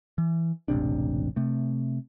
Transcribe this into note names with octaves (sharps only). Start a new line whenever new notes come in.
E3
E1 A1 C3 D4
C3 A3